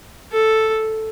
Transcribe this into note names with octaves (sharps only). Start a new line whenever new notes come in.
A4